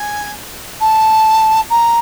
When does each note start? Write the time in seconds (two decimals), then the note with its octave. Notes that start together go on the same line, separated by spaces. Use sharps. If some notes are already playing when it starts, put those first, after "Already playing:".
Already playing: G#5
0.80 A5
1.70 A#5